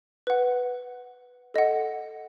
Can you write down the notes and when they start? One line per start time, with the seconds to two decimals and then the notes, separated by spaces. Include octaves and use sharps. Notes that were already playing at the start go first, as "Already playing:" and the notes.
0.27 B4 F#5
1.54 A4 D#5 F#5